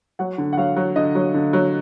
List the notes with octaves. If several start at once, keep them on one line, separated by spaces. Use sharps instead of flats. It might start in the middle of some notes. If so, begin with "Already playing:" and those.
F#3 F#5
D3
F#5
F#3 F5
F#3
D3 D#5
F#3
D3
F#3